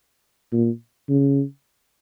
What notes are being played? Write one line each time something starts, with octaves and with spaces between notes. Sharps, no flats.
A#2
C#3